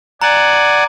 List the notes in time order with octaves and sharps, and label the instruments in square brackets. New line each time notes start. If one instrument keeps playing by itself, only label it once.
[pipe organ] D5 F#5 G#5 [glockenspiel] A#5